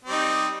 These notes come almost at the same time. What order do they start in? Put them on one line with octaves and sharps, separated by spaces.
C4 G3 D#4